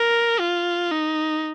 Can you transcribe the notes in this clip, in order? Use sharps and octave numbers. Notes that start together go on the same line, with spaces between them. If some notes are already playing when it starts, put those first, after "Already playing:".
Already playing: A#4
F4
D#4